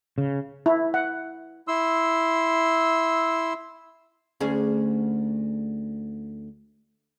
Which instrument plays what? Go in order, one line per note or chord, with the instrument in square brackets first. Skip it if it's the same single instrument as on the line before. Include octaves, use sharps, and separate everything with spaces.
[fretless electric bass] C#3
[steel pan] E4
F#5
[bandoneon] E4 C6 E6
[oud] D2 C#4 G#4